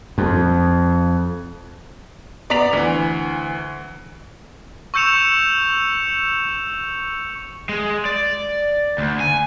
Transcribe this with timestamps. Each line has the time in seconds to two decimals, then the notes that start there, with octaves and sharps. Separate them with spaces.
0.18 F2
2.50 B3 D5 A#5 D6 B6 F7
2.73 D2 E3
4.94 C#6 E6 G6 C#7 E7 F7
7.69 G#3
8.05 D5
8.98 D2
9.20 G#5